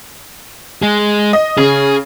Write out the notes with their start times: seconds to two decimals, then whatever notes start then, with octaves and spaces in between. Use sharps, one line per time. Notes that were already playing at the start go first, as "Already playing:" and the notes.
0.82 G#3 G#4
1.33 D#5
1.58 C#3 G#4